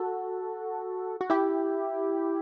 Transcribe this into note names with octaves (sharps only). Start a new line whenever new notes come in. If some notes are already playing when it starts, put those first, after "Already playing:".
Already playing: F#4 A4
F#4
E4 G4